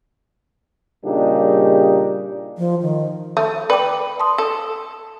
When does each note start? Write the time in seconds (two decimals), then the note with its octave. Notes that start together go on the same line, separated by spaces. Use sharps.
1.05 A#2 C#3 G3 D4 D#4 G4
2.58 F3
2.82 D#3
3.37 A3 A5
3.70 B4 D5 G5 D6
4.20 A5 C6 D#6
4.38 A4